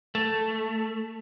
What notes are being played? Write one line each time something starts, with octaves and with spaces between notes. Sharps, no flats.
A3